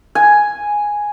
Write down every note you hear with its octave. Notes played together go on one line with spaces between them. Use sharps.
G#5